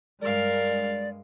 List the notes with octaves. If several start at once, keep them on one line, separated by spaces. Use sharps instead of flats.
G2 G#3 A#4 D5 F5